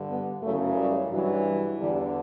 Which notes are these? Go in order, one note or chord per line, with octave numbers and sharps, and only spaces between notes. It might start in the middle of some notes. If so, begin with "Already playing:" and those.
Already playing: G2 D3
B3
F#2 C#3 E3 A3
G3
G2 E3 F#3
E2 D3 G3